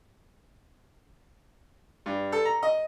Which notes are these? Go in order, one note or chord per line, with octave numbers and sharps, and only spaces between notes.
G2
A4
A#5
D#5